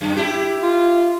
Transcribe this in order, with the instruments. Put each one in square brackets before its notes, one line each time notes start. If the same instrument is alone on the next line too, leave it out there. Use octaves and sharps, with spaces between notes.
[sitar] F#2
E4 G4
[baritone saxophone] F4